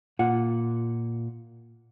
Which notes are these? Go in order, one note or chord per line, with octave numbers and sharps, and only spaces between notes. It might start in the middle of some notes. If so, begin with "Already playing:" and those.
A#2 F4 F#5